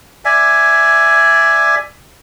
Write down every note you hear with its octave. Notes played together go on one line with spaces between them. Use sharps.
D5 E5 G#5